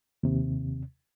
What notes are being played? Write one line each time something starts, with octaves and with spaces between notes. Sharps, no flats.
D#2 C3